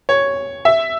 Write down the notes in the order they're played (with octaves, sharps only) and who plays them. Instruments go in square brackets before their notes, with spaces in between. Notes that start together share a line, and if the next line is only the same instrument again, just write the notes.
[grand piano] C#5
E5